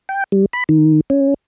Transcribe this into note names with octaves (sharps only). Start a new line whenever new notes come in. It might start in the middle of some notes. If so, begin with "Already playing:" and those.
G5
G3
B5
D#3
C#4